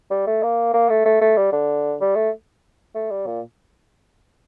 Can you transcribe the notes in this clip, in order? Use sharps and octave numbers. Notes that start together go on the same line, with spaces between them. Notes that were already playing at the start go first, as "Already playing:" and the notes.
G3
A3
A#3
A#3
A3
A3
A3
G3
D3
G3
A3
A3
G3
A#2